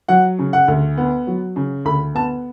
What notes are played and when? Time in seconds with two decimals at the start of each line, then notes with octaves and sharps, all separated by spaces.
0.08 F#3 F#5
0.39 C#3
0.53 F#5
0.68 D2
0.97 B3
1.27 F#3
1.56 C#3
1.85 D2 B5
2.15 B3 A5